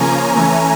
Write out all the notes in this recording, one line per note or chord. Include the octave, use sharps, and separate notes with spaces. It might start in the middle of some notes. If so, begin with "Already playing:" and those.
Already playing: C#3 F3 A#3 C#4 G#5 A#5
E3 A3 C#4